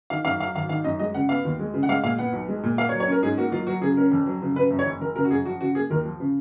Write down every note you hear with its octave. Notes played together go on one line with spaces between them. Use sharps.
D#3 F5
F#2 F5
F#3 F5
G#1 F5
D#3 F5
F#2 D#5
G#3 D#5
C#3 F#5
B3 F5
D#2
G#3
C#3
F#5
G#3 F5
A#2 F5
B3 F#5
B1
G#3
A#2
A#3 F5
C#5
F#3
C#5
C#4 A#4
G#2 G#4
A#3 F#4
F#3 F4
F#3 F#4
C#3 G#4
C#4 A#4
F2
F#3
C#3
C#3 B4
F#2
C#5
F#1
F#1 A#4
C#3 A#4
F#4
F#2 G#4
F3 F#4
C#3 F#4
A#3 G#4
D#2 A#4
F3
C#3